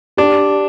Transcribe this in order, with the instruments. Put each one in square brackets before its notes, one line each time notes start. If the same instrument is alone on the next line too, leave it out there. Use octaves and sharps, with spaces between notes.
[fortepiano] D4 [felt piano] G4